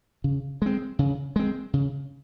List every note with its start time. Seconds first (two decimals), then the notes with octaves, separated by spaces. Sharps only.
0.24 C#3
0.62 G#3 C4
0.99 C#3
1.36 G#3 C4
1.73 C#3